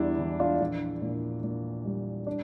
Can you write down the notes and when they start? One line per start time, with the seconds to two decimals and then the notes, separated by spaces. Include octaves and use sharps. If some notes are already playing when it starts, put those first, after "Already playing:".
Already playing: E2 G3 D4 E4
0.19 E3
0.40 D4 F4
0.61 A#1
1.02 A#2
1.43 A#2
1.85 G3
2.27 D4